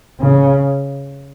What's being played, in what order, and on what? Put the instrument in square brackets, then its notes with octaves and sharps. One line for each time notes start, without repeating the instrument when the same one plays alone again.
[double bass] C#3